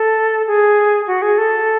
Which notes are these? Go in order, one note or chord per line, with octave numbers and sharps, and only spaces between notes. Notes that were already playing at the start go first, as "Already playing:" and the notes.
Already playing: A4
G#4
F#4
G#4
A4